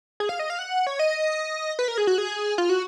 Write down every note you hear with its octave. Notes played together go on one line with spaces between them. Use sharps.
G#4
F5
D#5
F5
F#5
C#5
D#5
B4
A#4
G#4
F#4
G#4
F4
F#4